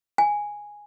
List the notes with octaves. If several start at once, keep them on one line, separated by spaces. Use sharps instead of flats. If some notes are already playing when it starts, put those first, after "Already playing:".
G#5